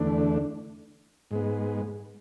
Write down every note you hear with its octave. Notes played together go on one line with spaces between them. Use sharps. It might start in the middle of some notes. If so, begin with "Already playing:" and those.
Already playing: E2 D3 A3 D4
G#2 G#3 B3